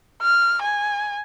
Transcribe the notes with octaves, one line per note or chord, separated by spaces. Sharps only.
F6
G#5